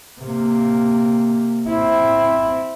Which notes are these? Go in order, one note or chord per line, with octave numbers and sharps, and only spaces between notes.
C3 A#3
C4 E4